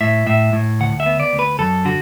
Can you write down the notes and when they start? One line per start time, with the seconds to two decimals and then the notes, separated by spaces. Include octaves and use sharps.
0.01 A2 E5
0.27 A2 E5
0.53 A2
0.80 D2 F#5
1.00 E5
1.06 B3
1.20 D5
1.33 D2
1.39 B4
1.59 F#2 A4
1.85 D3 F#4